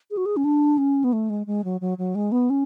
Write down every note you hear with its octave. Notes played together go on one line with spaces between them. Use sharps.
G#4
F#4
G#4
C#4
D4
C#4
B3
A3
G#3
G#3
F#3
F#3
F#3
G#3
B3
C#4